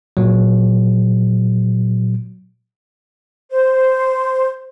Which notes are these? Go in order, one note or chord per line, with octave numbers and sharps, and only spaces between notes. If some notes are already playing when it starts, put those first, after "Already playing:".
A#2 F#3
C5